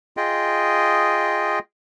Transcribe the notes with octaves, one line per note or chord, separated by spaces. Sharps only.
F4 G#4 D#5 G5